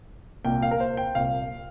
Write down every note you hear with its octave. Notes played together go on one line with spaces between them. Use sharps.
C2 A#2 A#3 G5
F5
A#4
C5
G5
C2 A#2 A#3 F5